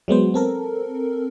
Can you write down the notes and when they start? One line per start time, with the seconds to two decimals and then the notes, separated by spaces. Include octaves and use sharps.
0.08 F#3 G#3 B3 C5
0.34 C4 A4 A#4